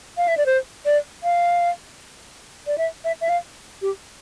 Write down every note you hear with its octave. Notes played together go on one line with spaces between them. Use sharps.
F5
E5
D5
C5
D5
F5
D5
E5
E5
E5
F5
G4